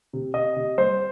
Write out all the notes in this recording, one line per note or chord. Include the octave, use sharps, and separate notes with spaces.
C3
C3 D#5
C3
G3 C5